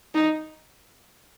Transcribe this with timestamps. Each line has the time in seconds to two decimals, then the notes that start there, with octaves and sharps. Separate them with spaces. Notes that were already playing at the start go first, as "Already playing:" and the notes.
0.15 D#4